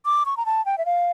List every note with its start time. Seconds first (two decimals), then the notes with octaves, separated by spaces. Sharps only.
0.05 D6
0.26 C#6
0.37 A#5
0.46 A5
0.66 G5
0.78 E5
0.86 F5